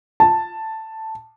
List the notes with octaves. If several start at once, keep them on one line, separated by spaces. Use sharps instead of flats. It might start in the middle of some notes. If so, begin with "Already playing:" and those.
A5